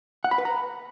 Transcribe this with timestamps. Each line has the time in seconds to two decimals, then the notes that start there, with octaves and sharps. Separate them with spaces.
0.24 F#5
0.31 B5
0.38 B4
0.45 A#5